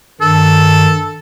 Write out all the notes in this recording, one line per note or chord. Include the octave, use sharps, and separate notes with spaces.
G2 D#3 A4